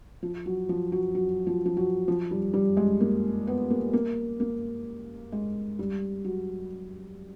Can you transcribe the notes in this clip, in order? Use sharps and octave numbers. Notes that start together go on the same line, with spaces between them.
F3
F#3
F3
F#3
F#3
F3
F3
F#3
F3
G3
G3
G#3
A#3
B3
A#3
A#3
A#3
G#3
G3
F#3